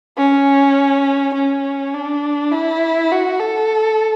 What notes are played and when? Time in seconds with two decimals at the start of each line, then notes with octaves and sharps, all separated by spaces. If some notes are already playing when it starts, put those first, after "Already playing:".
0.17 C#4
1.34 C#4
1.94 D4
2.52 E4
3.12 F#4
3.40 A4